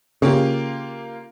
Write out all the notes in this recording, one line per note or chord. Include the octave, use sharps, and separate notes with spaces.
C#3 A#3 F4 G4